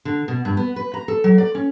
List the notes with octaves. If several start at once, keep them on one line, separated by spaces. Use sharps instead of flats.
D3
B2
G2
B3
B4
A#5
A4
F#3
D5
C#4